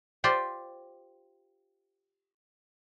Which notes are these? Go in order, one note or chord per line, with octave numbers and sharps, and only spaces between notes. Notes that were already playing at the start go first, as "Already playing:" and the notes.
F4 G4 C5 D5